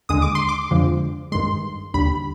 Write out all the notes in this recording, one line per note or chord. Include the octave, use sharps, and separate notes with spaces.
D#2 D3 G#3 D#6
D6
C6
D6
F2 D3 F3 G#3
G2 D#3 G#3 C6
D#2 D3 G3 B5